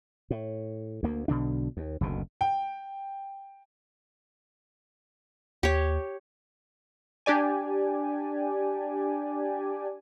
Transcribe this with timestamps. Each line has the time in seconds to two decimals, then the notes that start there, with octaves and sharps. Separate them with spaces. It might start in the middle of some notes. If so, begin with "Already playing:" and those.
0.30 A2
1.03 D2 A#3
1.28 B1 B2 D3 D4
1.77 D#2
2.01 F#1 D2 B2
2.41 G5
5.63 D#2 G4 C#5
7.26 D4 G4 D5 G#5